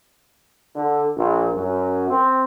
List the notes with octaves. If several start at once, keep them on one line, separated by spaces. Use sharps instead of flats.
D3
A#1
F#2
C4